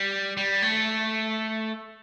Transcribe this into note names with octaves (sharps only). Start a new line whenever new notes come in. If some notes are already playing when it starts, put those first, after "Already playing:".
Already playing: G3
G3
A3